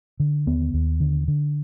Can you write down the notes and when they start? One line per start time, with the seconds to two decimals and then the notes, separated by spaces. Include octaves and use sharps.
0.20 D3
0.46 D#2 B3
0.74 D#2
1.00 D3
1.28 D3